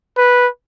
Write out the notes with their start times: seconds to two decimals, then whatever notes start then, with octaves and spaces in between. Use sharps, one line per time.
0.18 B4